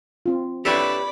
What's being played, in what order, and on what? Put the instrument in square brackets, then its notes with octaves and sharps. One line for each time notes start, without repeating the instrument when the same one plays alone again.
[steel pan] C4 F4
[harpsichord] D4 E4 A4 [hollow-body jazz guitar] G4 B4 C#5 [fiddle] D5 B5